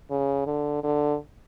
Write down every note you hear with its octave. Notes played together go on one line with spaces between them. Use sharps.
C#3
D3
D3